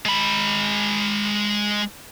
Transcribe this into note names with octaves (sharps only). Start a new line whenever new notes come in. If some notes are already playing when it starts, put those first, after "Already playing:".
G#3 B5